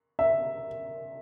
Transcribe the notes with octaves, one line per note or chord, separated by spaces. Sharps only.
E5